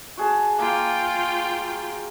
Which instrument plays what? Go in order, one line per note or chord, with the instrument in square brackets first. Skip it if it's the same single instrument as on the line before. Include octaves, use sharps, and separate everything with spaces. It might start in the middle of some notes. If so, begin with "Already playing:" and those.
[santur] F#4 G#4 A5
[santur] A#3 [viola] F4 G5